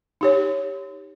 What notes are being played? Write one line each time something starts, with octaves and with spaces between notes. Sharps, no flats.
D#4 G4 C#5